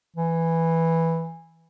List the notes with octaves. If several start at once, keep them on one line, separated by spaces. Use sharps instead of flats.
E3